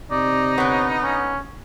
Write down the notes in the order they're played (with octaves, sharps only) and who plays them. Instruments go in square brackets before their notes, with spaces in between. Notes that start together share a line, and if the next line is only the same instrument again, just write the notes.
[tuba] C3 [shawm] D#4 [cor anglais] D5
[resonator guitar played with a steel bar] D3 B3 [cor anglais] C#5
[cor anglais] C#4